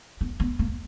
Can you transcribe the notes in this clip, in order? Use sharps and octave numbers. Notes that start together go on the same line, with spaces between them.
B3
B3
A#3